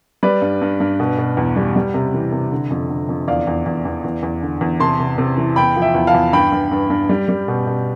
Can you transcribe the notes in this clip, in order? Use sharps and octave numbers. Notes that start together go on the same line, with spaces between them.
G3 B4 D5
G2
G2
G2
B2
B2
E2
G3
G3
C3
E3
C3
D3
F2
D3
F2
E2 D5 F5
E2
E2
E2
E2
E2
D3
E2
C3 A5 C6
C3
C3
E3
E2 G5 B5
F3
E5 G5
E2
F5 A5
E2
G2 G5 B5
G2
G2
G2
G3
G3
B2
B2